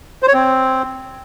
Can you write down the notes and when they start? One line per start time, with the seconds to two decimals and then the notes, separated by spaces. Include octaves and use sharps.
0.23 C5
0.28 C#5
0.34 C4